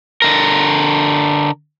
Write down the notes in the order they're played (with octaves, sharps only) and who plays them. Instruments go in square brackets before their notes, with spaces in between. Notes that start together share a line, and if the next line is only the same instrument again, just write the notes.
[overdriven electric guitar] D3 A#4